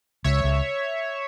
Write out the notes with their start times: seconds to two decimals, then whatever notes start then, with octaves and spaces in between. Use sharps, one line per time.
0.24 C#2 C#5 E5
0.44 C#2